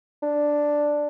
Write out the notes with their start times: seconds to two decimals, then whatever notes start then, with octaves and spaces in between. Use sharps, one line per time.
0.23 D4